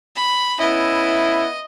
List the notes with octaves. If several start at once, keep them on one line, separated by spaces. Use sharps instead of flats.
B5
B3 C#4 E4 D#5